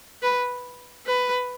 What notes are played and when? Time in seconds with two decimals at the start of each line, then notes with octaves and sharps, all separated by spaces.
0.22 B4
1.07 B4